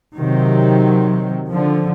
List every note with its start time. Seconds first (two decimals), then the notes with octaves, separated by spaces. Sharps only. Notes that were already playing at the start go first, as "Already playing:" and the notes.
0.16 C3 D#3 F#3
1.48 D3 F3